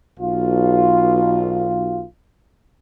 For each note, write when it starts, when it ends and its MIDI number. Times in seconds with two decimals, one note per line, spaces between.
0.20 2.05 35
0.20 2.05 65